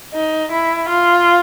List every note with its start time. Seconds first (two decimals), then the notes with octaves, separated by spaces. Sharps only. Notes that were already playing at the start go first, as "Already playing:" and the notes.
0.14 D#4
0.52 E4
0.89 F4